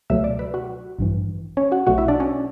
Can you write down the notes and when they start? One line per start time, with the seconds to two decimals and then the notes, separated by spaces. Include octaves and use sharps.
0.10 C#2 B2 F#3 A3 E5 E6
0.24 D5 D6
0.39 B4 B5
0.54 F#4 F#5
0.99 A1 G2 E3
1.57 C#4 C#5
1.72 F#4 F#5
1.86 B1 B2 F#3 A3 F#4 F#5
1.98 E4 E5
2.08 D4 D5
2.20 C#4 C#5